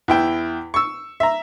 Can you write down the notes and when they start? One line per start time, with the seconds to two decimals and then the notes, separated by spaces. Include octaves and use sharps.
0.08 E2 E4 G5
0.74 C#6 E6
1.20 E5 A#5